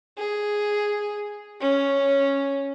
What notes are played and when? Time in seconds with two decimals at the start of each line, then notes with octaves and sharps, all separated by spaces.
0.18 G#4
1.60 C#4